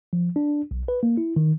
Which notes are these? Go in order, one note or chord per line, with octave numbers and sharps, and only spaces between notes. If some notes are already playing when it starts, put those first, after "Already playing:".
F3
D4
B1
B4
A#3
E4
D#3